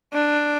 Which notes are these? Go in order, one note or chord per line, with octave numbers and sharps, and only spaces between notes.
D4